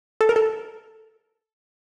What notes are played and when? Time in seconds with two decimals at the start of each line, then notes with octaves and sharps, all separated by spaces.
0.21 A4
0.29 A#4
0.36 A4